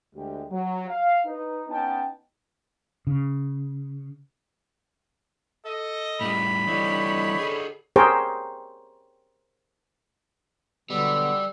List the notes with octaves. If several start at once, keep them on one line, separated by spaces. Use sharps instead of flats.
D2 G#3 G4
F#3
F5
D#4 B4
B3 C#4 D#4 F#5 G5 A5
C#3
A4 D#5
A2 G3 B5
D3 E3 G3 D#4 C#5
G#4 A4
G4 G#4 A#4 C5 C#5 G5
B2 D3 F#3 G3 B3 E6